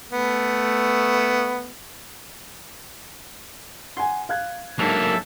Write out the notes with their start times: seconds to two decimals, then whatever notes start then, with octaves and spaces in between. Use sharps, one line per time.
0.12 A3 B3
3.97 F#5 G#5 C6
4.29 F5 F#6 G#6
4.79 G#2 D3 F#3 A#3 A4 E5